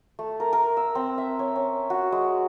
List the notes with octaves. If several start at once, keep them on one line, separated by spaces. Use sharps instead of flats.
A3
A#4
A#4
E6
C4
E5
C#5
C#4
F#4
G#3